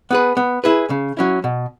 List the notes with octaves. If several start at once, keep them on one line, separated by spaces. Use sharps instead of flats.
B3 G#4 B4
B3
E4 G#4 B4
C#3
F#3 C#4 E4
B2